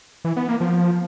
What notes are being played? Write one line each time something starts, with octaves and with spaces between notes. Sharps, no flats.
E3
B3
A#3
F3